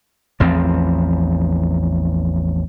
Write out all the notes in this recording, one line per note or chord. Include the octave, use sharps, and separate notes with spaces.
A1 E2 F3 C4